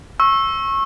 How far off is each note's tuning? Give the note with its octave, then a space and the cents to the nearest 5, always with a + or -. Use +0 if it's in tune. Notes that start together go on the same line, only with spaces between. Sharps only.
C#6 -25 E6 +0